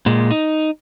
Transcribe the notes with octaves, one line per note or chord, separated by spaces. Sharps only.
A#2 G#3
D#4